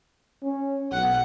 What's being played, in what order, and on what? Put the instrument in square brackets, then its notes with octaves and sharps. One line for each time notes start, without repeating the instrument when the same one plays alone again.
[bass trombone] C#4
[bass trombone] B1 [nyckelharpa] F#5